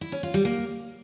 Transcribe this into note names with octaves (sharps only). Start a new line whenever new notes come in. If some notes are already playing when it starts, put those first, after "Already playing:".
E4
C#4
F4
G3
A#3